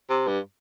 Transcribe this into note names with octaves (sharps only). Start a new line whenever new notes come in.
C3
G2